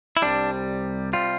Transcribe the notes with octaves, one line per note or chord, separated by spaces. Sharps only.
E4
C2 C3 G3 D4
C3 G3 F4